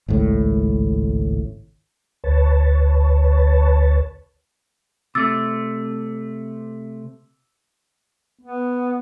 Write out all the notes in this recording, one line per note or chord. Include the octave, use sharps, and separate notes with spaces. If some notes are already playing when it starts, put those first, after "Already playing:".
G#1 C#2 A2
D2 B4 C#5 A5
C3 A3 D6 E6 A6
B3